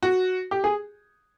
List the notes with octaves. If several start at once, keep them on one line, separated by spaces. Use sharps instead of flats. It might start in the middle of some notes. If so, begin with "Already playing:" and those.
F#4
G4
G#4